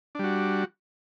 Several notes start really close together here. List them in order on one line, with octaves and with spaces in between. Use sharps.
D4 G3 F#4